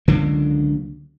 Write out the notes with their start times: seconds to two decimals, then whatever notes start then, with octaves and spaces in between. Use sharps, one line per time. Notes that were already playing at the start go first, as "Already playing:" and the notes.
0.08 C#2 D3 F#3 A#3